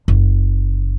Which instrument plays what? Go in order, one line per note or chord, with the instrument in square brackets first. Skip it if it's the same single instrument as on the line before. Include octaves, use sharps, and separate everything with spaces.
[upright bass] F#1